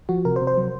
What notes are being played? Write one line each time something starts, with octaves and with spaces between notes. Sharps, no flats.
F3 F#4
C3 A#4
C5
C3
C5
F#3